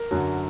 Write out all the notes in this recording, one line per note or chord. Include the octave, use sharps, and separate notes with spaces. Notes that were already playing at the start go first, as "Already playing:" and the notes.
Already playing: A#4
F#2 D3 F#3